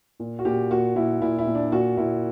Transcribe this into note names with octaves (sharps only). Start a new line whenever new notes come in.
A#2
F#4
A#2 G4
A#2 F#4
A#2 E4
A#2 E4
E4
A#2
D4
A#2 F#4
A#2 E4